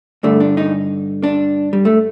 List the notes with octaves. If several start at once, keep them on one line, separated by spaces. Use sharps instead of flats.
G2 D3 A3
D4
D#4
D4
G3
A3